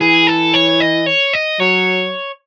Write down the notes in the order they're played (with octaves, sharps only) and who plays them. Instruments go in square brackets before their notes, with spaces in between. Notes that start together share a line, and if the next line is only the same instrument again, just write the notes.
[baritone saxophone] E3 [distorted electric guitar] G#4
[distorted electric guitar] A4
C#5
D#5
C#5
D#5
[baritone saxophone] F#3 [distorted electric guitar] C#5